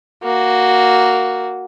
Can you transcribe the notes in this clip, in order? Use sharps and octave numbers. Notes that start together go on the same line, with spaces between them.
A#3 F#4